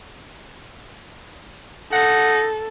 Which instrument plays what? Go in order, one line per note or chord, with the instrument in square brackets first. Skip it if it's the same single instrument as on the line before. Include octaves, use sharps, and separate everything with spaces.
[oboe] D#4 [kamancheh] A4 [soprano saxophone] F#5